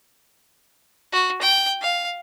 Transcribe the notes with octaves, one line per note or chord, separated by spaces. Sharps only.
F#4
G5
F5